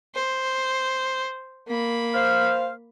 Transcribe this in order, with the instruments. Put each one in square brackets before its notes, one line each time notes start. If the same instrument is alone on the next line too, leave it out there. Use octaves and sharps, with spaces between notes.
[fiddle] C5
A#3 B5
[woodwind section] C5 F5